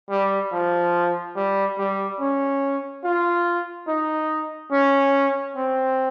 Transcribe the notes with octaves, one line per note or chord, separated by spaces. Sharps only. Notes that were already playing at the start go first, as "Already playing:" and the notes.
G3
F3
G3
G3
C#4
F4
D#4
C#4
C4